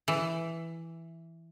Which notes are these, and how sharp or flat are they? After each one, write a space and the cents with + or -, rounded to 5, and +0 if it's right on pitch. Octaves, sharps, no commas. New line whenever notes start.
E3 +5